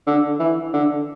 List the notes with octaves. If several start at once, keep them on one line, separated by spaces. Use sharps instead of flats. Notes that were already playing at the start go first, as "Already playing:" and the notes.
D3
E3
D3